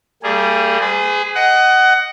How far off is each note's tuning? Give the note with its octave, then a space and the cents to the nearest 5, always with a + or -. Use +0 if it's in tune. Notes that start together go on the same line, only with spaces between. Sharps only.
G3 +0 A#3 -40 G#4 +0
G#4 +0 B4 +45
D#5 +0 F#5 +20